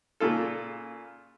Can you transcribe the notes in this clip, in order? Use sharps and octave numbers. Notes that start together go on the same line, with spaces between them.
A#2 C#3 F4 A4